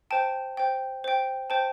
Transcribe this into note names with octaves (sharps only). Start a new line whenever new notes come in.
C5 G5 A5
C5 G5
C5 G5
C5 G5 A5